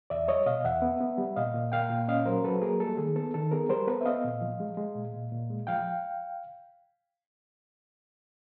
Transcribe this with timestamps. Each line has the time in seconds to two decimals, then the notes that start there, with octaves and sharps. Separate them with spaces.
0.10 E2 D5 E5
0.28 G3 C#5 D#5
0.46 B2 D#5 F5
0.65 E2 E5 F#5
0.82 B3
1.01 B3
1.18 G3
1.36 A#2 D#5 F5
1.54 A#2
1.72 A#3 F5 G5
1.90 A#2
2.08 C#4 D#5 F5
2.26 F#3 A#4 C5
2.44 F#3 A4 B4
2.62 A#3 G#4 A#4
2.80 G3 A4
2.97 D#3 G#4
3.16 B3 A4
3.34 D#3 A4
3.51 B3 G#4 A#4
3.69 G3 A#4 C5
3.87 B3 A4 B4
4.01 E5
4.05 B3 D#5 F5
4.24 A#2
4.41 F3
4.60 G#3
4.77 G#3
4.95 A#2
5.13 A#2
5.32 A#2
5.50 G#3
5.67 F3 F5 G5